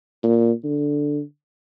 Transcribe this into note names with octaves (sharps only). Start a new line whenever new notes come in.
A#2
D3